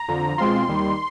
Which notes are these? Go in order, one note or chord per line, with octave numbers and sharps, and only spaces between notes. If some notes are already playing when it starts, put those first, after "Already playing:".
Already playing: A#5
F2 D3 F3
B2 G#3 C4 F4 C6
D#2 D#3 G3